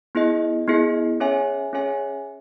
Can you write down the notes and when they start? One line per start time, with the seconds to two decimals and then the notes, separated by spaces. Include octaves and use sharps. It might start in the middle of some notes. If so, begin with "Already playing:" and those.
0.15 B3 E4 G#4 D#5
0.67 B3 E4 G#4 D#5
1.20 C#4 G#4 C#5 E5 G#5
1.73 C#4 G#4 C#5 E5 G#5